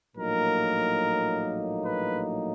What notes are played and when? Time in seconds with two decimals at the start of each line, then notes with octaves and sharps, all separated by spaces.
0.17 A#1 A2 F#3 A#3 D#4 A#4
1.85 B4